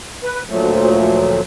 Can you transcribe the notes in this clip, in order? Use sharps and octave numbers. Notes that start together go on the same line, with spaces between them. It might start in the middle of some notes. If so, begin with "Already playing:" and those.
B4
D2 A#2 F3 F#3 A3